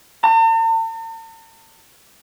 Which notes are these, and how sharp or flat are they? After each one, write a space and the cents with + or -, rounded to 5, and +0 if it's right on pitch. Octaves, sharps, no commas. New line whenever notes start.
A5 +45